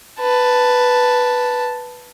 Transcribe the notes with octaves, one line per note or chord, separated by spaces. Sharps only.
B4 A5